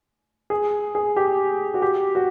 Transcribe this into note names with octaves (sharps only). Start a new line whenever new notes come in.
G#4
G#4
G4
F#4
G4
F#4